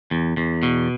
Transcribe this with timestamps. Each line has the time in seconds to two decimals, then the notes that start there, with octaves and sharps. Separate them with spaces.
0.11 E2
0.37 E2
0.63 B2